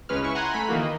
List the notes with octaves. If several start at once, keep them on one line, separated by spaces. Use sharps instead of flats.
C#2 G#3 C#4 B4 F6
E4 C#6
F#5 G#5 A#5 C6 F#6
A3 B5
D#3 E3 A#3 F#4
D#5